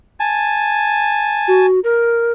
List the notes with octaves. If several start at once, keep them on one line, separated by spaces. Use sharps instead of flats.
G#5 A5
F#4
A#4